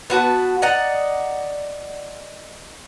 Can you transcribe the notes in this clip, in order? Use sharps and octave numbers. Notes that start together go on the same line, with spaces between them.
B3 F#4 B4 A5
D5 D#5 F#5 A#5